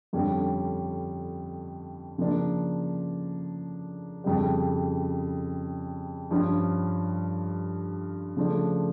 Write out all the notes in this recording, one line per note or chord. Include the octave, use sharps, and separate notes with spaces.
F2 D3 G3 C#4
C#3 F3 A#3 D4
F2 C#3 G3
G2 F3 C#4
C#3 F3 A3 D4